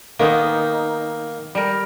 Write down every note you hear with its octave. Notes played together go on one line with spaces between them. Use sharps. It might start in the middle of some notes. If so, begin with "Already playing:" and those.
D#3 A#3 B3 D#4
G3 A#4